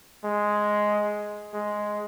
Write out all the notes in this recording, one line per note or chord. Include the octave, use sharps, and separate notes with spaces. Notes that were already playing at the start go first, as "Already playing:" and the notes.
G#3
G#3